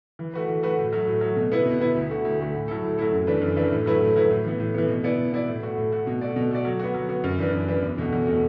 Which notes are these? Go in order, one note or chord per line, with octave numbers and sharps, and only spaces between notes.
E3
A3 F#4 B4
E3
A3 F#4 B4
A2
F#3 A3
A2
F#3 A3
B2
B3 E4 B4
B2
B3 E4 B4
D2
D3 A3 F#4
D2
D3 A3 F#4
A2
F#3 A3 E4 A4
A2
F#3 A3 E4 A4
F#2
E3 A3 D4 B4
F#2
E3 A3 D4 B4
A2
F#3 A3 E4 B4
A2
F#3 A3 E4 B4
A2
E3 B3
A2
E3 B3
B2
B3 E4 D5
B2
B3 E4 D5
A2
A3 F#4
A2
A3 F#4
B2
A3 F#4 D5
B2
A3 F#4 D5
F#3
B3 F#4
F#3
B3 F#4
F#2
E3 D4 B4
F#2
E3 D4 B4
E2
B2 A3 F#4
E2
B2 A3 F#4